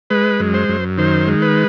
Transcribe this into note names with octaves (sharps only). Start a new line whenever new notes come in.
G#3 B4
F#2
C5
F#2
D#3 C5
G#3
B4